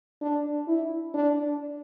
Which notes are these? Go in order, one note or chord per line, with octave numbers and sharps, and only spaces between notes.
D4
E4
D4